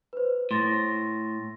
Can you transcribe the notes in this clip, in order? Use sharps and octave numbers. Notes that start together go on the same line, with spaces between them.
B4 C5
A2 C6 A6 A#6